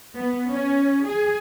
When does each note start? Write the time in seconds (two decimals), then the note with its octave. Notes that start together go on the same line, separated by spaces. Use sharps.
0.17 B3
0.51 C#4
1.07 G#4